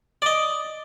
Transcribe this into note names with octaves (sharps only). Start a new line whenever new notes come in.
D5 D#5